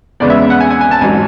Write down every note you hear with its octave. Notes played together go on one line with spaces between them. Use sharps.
E2 C#3 G#3 B3 D5
E5
F#5
G#5
G#5
G#5
A5
A1 G#2 F#3 G#5